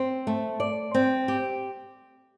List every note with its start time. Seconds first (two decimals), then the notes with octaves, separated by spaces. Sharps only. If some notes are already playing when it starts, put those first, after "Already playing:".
Already playing: C4
0.27 A3
0.60 D5
0.94 C4
1.28 G4